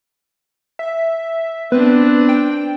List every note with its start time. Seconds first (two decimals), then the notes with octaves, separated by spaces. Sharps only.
0.79 E5
1.72 B3 C4 D4 B4
2.29 G5